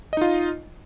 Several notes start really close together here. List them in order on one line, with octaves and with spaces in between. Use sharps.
D#5 D#4 F4